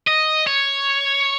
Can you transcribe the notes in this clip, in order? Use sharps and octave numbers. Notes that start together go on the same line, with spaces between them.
D#5
C#5